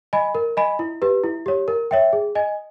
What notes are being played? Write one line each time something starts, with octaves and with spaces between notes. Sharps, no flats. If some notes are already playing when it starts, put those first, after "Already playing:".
D#5 G#5 B5
A#4
D#5 G#5 B5
E4
G4 B4
E4
G4 C#5
A#4
C#5 E5 G5
G#4
D#5 G#5